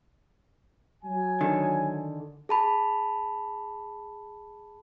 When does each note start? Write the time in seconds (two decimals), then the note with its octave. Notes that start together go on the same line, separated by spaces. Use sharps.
1.04 F#3 G#5
1.41 D3 D#3
2.49 G#4 A5 B5